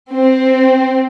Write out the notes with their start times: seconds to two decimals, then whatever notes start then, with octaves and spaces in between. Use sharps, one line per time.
0.12 C4